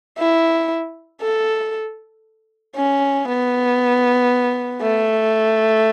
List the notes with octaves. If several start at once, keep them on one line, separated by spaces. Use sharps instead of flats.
E4
A4
C#4
B3
A3